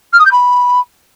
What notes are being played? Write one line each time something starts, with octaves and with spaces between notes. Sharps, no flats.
F6
D#6
G6
B5